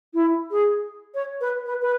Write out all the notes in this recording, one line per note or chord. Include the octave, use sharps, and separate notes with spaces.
E4
G#4
C#5
B4
B4
B4